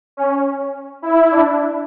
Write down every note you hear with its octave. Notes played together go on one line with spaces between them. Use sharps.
C#4
E4
D4